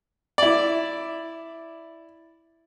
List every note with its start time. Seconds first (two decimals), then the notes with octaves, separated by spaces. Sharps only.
0.38 E4 D5